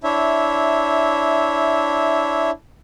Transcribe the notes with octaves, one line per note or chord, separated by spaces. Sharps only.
D4 E4 C#5 E5